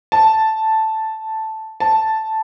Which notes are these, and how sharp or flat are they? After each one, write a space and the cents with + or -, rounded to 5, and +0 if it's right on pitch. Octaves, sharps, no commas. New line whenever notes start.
A5 +0
A5 +0